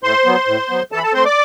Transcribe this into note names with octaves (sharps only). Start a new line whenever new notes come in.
A2 C5 C6
F#3 B3
A2
F#3 B3
E3 A4 A5
B5
A4 A5
A3 C4 C5 C6
D5 D6